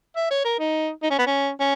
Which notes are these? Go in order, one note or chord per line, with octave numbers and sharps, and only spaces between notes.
E5
C#5
A#4
D#4
D#4
C#4
B3
C#4
C#4